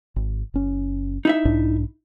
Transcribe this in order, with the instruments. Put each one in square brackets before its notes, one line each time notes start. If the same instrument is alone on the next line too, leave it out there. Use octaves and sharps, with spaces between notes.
[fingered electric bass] G#1
F#1 C#4
[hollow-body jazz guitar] D#4 E4 E5
[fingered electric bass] B1 G#2 D4